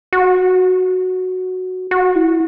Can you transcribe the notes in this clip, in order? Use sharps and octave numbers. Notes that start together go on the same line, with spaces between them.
F#4
F#4
E4